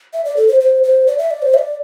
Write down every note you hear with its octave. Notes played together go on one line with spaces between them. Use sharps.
E5
D5
A4
C5
C5
C5
D5
E5
D5
C5
E5
D5